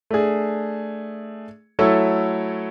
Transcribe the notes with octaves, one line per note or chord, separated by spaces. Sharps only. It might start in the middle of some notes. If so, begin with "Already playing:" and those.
A3 D4 G#4
F#3 A3 E4 A4 C#5